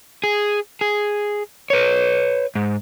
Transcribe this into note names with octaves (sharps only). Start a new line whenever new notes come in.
G#4
G#4
B4 C#5
G#2